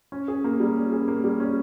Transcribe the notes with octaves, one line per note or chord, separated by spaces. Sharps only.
C#4
G#4
A#3
G3
C#4
G#4
A#3
G3
C#4